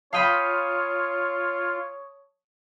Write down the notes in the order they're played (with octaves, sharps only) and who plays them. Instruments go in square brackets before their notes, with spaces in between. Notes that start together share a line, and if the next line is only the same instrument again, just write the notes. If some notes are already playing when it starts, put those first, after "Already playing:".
[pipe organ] F4 [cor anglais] C#5 [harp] F5 G5 B5 [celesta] A5 D#6 D#7